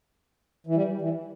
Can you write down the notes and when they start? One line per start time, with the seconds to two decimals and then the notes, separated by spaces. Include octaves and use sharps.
0.67 E3
0.75 G3
1.01 E3